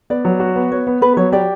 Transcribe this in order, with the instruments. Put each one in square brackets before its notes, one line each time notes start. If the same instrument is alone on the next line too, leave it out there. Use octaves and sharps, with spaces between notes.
[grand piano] B3 [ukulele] D5
[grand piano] F#3
F#4
B3
[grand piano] B3 [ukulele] C#5
[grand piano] B3
[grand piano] B3 [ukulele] B4
[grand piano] F#3 [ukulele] C#5
[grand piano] G4 [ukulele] D5